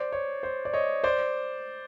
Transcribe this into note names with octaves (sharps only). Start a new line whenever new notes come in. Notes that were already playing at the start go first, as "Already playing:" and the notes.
Already playing: C5 D5
C#5
C5
D5
C#5 D#5
C5 D5